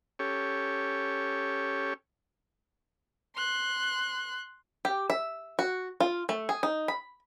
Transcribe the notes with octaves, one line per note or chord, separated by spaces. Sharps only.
C#4 G4 A4 C#5
C6 F#6
G4
E5
F#4
F4
A3
G#4
D#4
B5